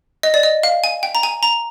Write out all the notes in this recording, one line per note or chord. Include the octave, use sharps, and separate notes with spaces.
D#5
D5
D#5
F5
G#5
G5
A#5
G#5
A#5